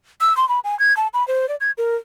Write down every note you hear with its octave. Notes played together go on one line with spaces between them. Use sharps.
E6
C6
B5
G#5
G#6
A5
B5
C5
D5
G#6
A#4